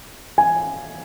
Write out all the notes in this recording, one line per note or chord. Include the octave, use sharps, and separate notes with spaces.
G#5